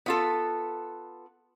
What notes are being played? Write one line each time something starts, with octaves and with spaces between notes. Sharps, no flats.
B3 F4 A4